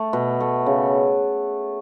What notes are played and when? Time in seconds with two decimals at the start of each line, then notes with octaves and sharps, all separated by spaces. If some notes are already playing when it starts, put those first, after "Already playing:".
Already playing: A3
0.13 B2
0.40 A3
0.66 C#3